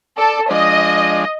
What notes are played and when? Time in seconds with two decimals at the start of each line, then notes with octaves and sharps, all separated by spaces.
0.18 A4 D5
0.50 F3 G#3 D4 D#5